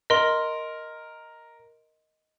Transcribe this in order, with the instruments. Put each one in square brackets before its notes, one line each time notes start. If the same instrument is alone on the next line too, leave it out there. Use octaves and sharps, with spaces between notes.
[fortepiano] A#4 [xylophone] D#5 C6